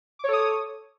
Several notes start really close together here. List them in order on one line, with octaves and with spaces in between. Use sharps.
D6 C#5 A4 D#6